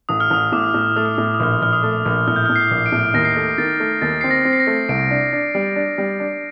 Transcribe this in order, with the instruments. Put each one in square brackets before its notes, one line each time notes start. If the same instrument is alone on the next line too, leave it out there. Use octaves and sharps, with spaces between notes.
[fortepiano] A1 [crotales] D#6
[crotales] F6
[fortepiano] A1 [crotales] D#6
[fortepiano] A2 [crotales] D6
[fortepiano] A2
[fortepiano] A3 [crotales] D#6
[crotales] F6
[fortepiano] A2 [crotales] D#6
[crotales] F6
D#6
[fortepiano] A#1 [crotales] F6
[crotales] D#6
[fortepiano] A#1 [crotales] F6
[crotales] D#6
[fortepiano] A3
A#1
[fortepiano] A2 [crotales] F6
[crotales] G6
F6
[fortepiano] A2
[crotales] C7
[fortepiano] A#1
[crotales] D7
[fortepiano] A2
[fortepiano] D#2 [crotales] A#6
[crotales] C7
[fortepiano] A3 [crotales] A#6
[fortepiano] D#3 [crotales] A6
[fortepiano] A3
[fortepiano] D#2 [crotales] A6
[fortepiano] C4 [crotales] C7
[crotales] A#6
[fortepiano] C4
[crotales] C7
A#6
[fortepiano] A3
[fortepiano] C2 [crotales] D7
[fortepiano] D4
D4
G3
D4
G3
D4